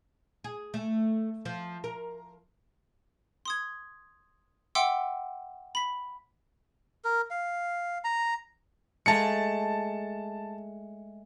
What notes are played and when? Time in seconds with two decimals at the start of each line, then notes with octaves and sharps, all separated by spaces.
0.44 G#4
0.74 A3
1.45 F3
1.84 A#4
3.45 C6 D#6 G#6
4.75 E5 F#5 G5 C6 D6 E6
5.75 B5 B6
7.05 A#4
7.31 F5
8.04 A#5
9.06 G#3 A3 A5 A#5 C#7